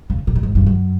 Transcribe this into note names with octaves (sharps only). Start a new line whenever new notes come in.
C#3
A#2
A2
G#2
G2
F#2